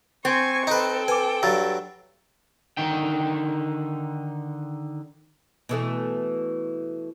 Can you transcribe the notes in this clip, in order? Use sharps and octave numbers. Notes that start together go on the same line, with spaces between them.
C4 G#5 C#6
D#4 A4 B4 G5
B4 G#5 D6
G2 F#3 E6 A6
D3 D#3 D#4 G5
B2 E3 A3